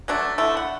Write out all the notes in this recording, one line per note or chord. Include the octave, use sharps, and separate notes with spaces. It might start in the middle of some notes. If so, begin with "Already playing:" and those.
F#3 A3 D4
D3 A3 E4
F#5